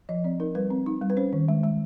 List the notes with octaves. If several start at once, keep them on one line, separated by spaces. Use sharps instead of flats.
F3 D#5
C4 D5
D#4 A#4
G3 B4
C4
D#4
G3
B4
C#4 C5
D#3
G#3
G#3